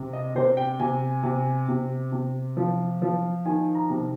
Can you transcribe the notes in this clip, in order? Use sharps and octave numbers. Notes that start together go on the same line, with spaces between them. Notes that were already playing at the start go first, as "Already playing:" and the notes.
Already playing: C3
D#5
C3 C5
G5
C3 G#5
C3
C3
C3
F3
F3
D#3 G#5
A#5
C3